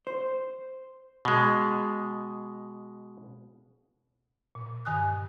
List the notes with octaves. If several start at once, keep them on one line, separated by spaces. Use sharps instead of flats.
C5
B2 G#3
A#2
G2 D#3 G#5 D#6 F#6